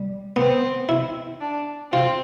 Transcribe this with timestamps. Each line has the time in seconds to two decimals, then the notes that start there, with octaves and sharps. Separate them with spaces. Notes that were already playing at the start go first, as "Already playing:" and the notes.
Already playing: G3
0.36 B3 C4
0.89 E4
1.41 D4
1.92 C4 F4